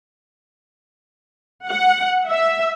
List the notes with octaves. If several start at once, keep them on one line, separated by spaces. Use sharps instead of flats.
F#5
E5